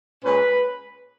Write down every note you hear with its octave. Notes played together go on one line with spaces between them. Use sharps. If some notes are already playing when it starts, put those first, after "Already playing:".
A#2 G#3 C#4 B4